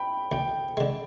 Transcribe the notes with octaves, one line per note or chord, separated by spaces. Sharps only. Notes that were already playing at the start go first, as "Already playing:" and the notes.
Already playing: G5 B5
D2 G5
D3 G#3